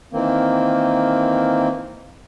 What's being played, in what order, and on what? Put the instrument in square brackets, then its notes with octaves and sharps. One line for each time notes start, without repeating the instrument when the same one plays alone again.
[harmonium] D#3 E3 A#3 C4